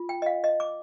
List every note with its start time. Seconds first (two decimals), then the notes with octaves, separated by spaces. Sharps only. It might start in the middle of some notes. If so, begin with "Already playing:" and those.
Already playing: F4
0.09 G5
0.22 D#5
0.26 F5
0.44 D#5
0.60 D6